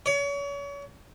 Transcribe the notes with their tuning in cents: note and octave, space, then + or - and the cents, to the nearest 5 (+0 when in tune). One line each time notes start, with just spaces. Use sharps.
C#5 +35